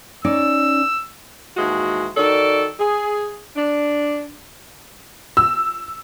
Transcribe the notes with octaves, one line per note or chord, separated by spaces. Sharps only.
C#4 D#4 D5 E6
D#2 E3 G#3 F#4
D#3 F#4 A4 A#4 D5
G#4
D4
E6